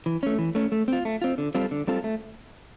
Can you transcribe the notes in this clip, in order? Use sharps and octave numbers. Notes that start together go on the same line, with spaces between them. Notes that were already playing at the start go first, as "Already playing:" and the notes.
E3
A3 C#4
E3
A3 C#4
A3
C4 F4
A3
C4 F4
D3
G3 C4 F4 A4
D3
G3 C4 F4 A4
A3